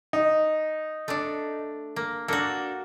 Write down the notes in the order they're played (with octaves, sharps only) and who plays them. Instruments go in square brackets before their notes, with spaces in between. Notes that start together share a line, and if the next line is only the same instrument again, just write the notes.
[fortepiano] D#4
[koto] A3 D4
A#3
[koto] A#3 F#4 [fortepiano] D4 A4